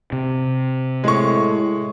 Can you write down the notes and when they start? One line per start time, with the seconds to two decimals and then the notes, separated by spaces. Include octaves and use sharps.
0.12 C3
1.04 A2 G#3 C#6